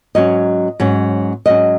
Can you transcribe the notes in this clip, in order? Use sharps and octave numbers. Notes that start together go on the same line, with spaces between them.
G#2 F#3 C#4 D#5
G#2 F#3 C#4
G#2 F#3 C#4 D#5